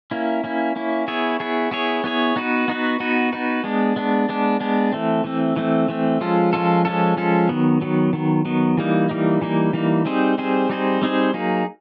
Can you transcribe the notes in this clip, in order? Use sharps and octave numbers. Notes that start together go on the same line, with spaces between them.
A#3 C#4 E4
A#3 C#4 E4
A#3 C#4 E4
B3 E4 G#4 C#5
B3 E4 G#4 C#5
B3 E4 G#4 C#5
B3 E4 G#4 C#5
B3 D#4 F#4 B4
B3 D#4 F#4 B4
B3 D#4 F#4 B4
B3 D#4 F#4 B4
G#3 B3 D4
G#3 B3 D4
G#3 B3 D4
G#3 B3 D4
E3 A3 C4
E3 A3 C4
E3 A3 C4
E3 A3 C4
F3 G#3 C#4 F4 A4
F3 G#3 C#4 F4 A4
F3 G#3 C#4 F4 A4
F3 G#3 C#4 F4 A4
D#3 F#3 B3
D#3 F#3 B3
D#3 F#3 B3
D#3 F#3 B3
E3 G3 A#3 D#4
E3 G3 A#3 D#4
E3 G3 A#3 D#4
E3 G3 A#3 D#4
G3 C4 D#4 G#4 C5
G3 C4 D#4 G#4 C5
G3 C4 D#4 G#4 C5
G3 C4 D#4 G#4 C5
F#3 A#3 D#4 G#4